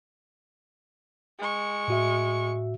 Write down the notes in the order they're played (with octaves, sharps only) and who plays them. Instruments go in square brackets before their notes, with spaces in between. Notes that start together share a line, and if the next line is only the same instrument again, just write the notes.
[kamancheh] G#3 C#6
[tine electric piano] A2 F#4 E5